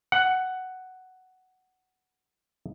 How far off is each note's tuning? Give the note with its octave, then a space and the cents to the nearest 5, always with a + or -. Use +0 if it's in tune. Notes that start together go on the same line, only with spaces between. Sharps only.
F#5 +10